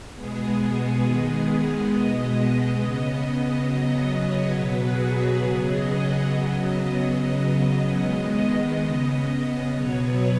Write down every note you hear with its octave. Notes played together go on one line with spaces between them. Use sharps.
B2 G#3 B3 G#4
D#3 G#3 B3 G#4
B2 G#3 B3 D#5
C#3 B3
C#3 F#3 B3 D#5
D#5
C#5
B2 F#3 B3 B4
G#4
F#4
C#3 F#3 B3 G#4
D#5
F#5
C#3 F#3 B3 D#5
C#3 F#3 B3
D#3 G#3 B3
C#3 B3
B2 F#3 B3 C#5
B4